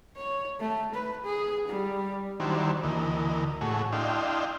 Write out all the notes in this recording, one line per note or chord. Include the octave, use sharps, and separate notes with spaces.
C#5
A3
B4
G#4
G3
D#3 F#3 G3 D4 E4 C5
D2 E3 A#3 D#5
A2 A3 F#4 G#4 C#5
D4 E4 D#5 F5 G5 C6